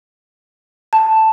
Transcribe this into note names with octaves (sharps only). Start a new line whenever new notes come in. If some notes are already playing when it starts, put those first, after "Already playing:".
A5